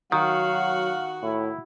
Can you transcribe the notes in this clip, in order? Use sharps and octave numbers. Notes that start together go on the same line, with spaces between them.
D#3 F#3 F#4 F5 F#5
A2 E4